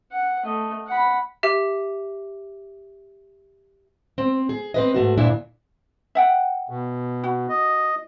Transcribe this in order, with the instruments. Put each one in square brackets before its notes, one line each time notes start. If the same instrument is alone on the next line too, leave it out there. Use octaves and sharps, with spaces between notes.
[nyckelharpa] F#5
A3 D#5
F#5 B5
[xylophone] G4 E5
[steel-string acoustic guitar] C4
G#4
C4 B4 D#5
G#2 A3 F#4
D2 G2 A#2 D4 E4 G#5
[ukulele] E5 F#5 G5
[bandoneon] B2
[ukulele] F#4
[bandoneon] D#5